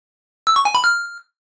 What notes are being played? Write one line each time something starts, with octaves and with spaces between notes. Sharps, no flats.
E6
C#6
G#5
B5
F6